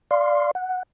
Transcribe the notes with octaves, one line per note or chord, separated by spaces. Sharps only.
D5 F5 C6
F#5